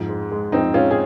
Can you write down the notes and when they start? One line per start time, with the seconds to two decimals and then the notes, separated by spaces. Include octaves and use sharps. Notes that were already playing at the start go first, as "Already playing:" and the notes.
Already playing: F2 G#2
0.09 G#3
0.31 G#3
0.52 F2 C4 D#4
0.74 G#3 C#4 F4
0.91 G#4